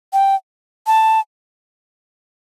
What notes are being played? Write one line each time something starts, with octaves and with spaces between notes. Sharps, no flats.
G5
A5